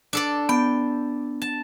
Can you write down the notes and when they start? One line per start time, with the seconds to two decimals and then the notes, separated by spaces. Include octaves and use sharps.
0.13 D4 A4 D5
0.49 B3 G5
1.42 A5